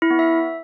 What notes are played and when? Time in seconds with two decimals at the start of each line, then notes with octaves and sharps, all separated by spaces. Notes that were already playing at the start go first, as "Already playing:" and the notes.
0.02 E4
0.10 B3
0.19 E5